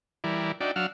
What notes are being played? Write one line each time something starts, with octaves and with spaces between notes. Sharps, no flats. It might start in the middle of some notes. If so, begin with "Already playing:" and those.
E3 G3 E4 A#4 D5
D4 D#4 F#4 D5 E5 G5
F#3 D4 F5 F#5 E6 F6